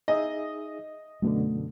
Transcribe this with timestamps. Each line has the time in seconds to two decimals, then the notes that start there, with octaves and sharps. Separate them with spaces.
0.08 D#4 G#4 D#5 E5
1.22 F#2 B2 D3 A3